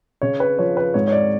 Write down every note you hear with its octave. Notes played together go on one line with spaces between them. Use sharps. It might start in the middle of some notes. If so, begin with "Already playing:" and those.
C#3 C#5
B4
F3 C#5
B4
G#2 C#5
C#5
D5